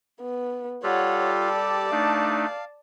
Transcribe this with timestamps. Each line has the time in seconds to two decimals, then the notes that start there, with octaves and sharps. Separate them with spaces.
0.21 B3
0.83 G3 F4 G4 A4 C#5 F#5
1.45 D5 A5
1.91 A3 D4 D#4 F5